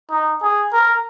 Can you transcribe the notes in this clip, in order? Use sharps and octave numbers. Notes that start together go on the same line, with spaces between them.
D#4
G#4
A#4